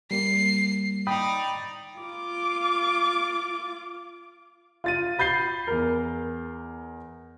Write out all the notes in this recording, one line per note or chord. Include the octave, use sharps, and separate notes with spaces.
G3 A#3 C7
D#4 D5 G5 B5 D#6
F4 D6
F4 A6 D#7
B5 G6 A6 C7 G7
E2 A#4